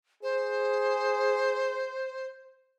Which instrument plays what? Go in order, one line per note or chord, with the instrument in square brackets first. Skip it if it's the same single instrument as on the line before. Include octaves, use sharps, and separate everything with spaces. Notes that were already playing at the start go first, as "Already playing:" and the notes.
[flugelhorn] G#4 [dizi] C5